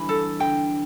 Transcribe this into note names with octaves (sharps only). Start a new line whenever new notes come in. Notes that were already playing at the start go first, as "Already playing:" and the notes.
Already playing: D3 E3 G3 B5
A4
D3 G5